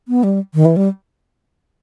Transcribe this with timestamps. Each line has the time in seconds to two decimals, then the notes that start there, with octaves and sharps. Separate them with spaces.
0.08 B3
0.23 G3
0.54 D#3
0.65 E3
0.77 G3